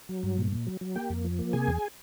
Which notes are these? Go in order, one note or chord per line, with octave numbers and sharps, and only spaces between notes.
F#3
G2
A#2
A#2
F#3
F#3
A#3 G4 G5
F2
F3
A#3
C3 G#4 G#5
E2